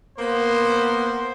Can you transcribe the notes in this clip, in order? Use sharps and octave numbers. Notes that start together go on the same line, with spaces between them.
A#3 B3 C5